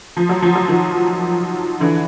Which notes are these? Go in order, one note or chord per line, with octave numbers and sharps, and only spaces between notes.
F3
F#3
F3
F#3
D#3 F3
D3 E3